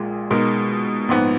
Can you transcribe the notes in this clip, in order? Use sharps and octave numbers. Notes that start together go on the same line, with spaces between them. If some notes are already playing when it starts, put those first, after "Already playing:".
Already playing: A#1 A#2 G#3
B2 G#3 D#4 A#4
A#1 G#2 F3 B3